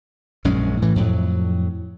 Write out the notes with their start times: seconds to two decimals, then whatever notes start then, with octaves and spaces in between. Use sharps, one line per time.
0.44 A#1 F#2 G#3 C#4
0.82 A2 E3
0.96 F2 A2 F#3